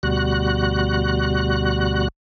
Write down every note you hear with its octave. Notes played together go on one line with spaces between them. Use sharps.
D2 B2 G3 F#4 F#6